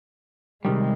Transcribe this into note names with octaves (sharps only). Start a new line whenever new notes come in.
C3 D#3 G3 G#3